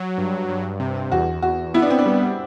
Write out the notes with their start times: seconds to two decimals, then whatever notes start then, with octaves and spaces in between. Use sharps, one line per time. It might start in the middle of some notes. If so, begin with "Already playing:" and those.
Already playing: F#3
0.18 G2
0.48 G2
0.80 C3
1.12 E2 F#4
1.42 E2 F#4
1.74 B3 E4
1.82 D4
1.90 C4
1.99 D4
2.06 G3